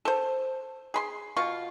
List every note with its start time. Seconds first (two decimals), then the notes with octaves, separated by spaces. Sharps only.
0.05 A4 C5
0.94 G#4 B5 C6
1.36 B2 F4 C#6